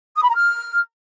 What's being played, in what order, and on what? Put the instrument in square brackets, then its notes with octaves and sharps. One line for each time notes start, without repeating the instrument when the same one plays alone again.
[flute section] D#6
B5
A#5
F6